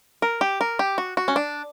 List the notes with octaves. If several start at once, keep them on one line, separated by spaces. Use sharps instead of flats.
A#4
G4
A#4
G4
F#4
F#4
C#4
D4